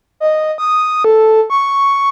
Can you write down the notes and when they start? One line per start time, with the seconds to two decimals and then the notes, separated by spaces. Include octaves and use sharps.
0.20 D#5
0.58 D#6
1.04 A4
1.50 C#6